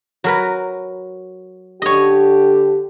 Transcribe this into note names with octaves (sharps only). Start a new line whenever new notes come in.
F#3 A#4 B4
D3 G4 C#5 D#5